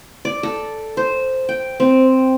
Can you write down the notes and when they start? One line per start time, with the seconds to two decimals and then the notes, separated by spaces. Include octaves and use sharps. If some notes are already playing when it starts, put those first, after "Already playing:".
0.25 D5
0.43 A4
0.97 C5
1.49 G5
1.80 C4